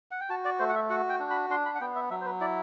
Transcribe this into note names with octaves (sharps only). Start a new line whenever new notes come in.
F#5
G5
F#4 A5
D5
A3 C5
F#5
E5
F#4 F#5
G5
D4
B5
D4 C6
B5
F#5
B3 G5
E5
F#3 E5
C5
B4
E4 D5